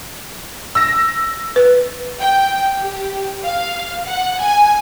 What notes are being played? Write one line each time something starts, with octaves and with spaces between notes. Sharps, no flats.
E6 A#6
B4
G5
G4
F5
F#5
G#5